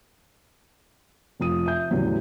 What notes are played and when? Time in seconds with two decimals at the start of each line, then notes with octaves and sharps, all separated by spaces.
1.40 F1 F3 D#6 D#7
1.66 E5 G6
1.91 E2 A2 C#3 F#3 G3